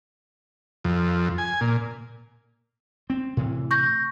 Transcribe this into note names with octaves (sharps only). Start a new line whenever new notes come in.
F2
G#5
A#2
C4
A2 C3 E3
C#6 G6 A#6